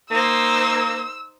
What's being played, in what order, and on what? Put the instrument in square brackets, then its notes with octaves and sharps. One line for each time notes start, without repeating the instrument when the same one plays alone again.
[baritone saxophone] A#3 [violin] D#4 C5 [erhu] E6